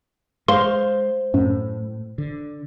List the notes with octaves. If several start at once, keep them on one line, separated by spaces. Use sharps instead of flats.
G#3 C5 F5 C6
F#2 A2
D3